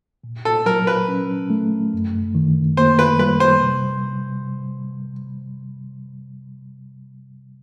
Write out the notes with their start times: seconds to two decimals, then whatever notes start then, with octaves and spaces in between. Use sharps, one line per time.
0.24 A#2
0.45 A4
0.66 F#3 A#4
0.87 B4
1.08 C#4
1.50 A3
1.93 F#2
2.35 D#3
2.77 A#3 C5
2.99 B4
3.19 G3 B4
3.40 C5
3.62 C3